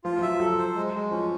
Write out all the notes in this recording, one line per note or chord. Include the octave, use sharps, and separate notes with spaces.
F3 F4
F3
F#3 E5
F#3 A4
C5
G#3
G#3
F3 C#4